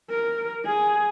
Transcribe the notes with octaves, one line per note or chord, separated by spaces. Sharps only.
A#4
G#4